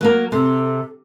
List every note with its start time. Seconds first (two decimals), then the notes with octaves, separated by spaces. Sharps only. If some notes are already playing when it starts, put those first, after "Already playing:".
0.01 F#3 A#3 A#4
0.32 C3 A4